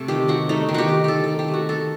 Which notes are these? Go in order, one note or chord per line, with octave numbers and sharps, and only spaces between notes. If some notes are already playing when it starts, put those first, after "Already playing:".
Already playing: C3 A3 A4
D#3 G4
D#3 F#4
A3 D#4
D#3
F#4 G4
D#3
D#3 G4 A4
D#3 A4
G4
A3
F#4
D#3 A4